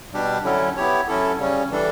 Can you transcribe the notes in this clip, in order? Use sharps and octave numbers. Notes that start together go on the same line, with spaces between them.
B2 G3 D4 G4
D3 F#3 C#4 E4 A4
B3 E4 G4 C#5
F#3 C#4 E4 A4
C#3 G3 C#4
E3 G3 D4 A4